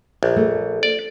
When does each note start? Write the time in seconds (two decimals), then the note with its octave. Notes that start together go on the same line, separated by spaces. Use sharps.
0.23 A#1
0.36 A3
0.83 D5